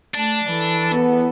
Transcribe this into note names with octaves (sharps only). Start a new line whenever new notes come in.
A3 D4 A5
E3 A4
E2 B3